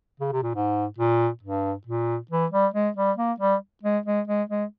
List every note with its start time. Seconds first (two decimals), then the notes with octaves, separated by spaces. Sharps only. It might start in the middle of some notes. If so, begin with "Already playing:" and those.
0.20 C#3
0.32 C3
0.43 A#2
0.55 G#2
0.98 A#2
1.43 G2
1.87 A#2
2.31 E3
2.52 G3
2.74 G#3
2.96 G3
3.17 A#3
3.40 G3
3.83 G#3
4.06 G#3
4.28 G#3
4.49 G#3